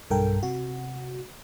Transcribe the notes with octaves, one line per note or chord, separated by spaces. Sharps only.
B1 G2 A4 A#4 G5
C3 F#4